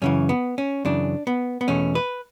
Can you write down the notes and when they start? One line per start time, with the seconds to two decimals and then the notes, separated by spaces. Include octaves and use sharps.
0.02 F#2 C#3 E3 C#4
0.29 B3
0.58 C#4
0.85 F#2 C#3 E3 D4
1.27 B3
1.61 B3
1.68 E2 B2 A3 C#4
1.95 B4